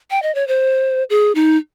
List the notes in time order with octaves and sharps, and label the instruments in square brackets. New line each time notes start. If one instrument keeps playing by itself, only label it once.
[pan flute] G5
D#5
C#5
C5
G#4
D#4